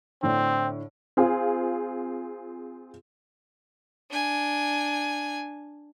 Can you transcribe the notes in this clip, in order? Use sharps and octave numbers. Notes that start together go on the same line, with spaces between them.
A2 D3 C4
C4 F4 G#4
D4 G#5